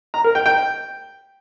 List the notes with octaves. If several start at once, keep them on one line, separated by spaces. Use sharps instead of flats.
A#5
A#4
G5
G5